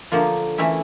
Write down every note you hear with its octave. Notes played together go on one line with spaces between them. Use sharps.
D3 F3 A#3 F4
E3 A3 C#4 E4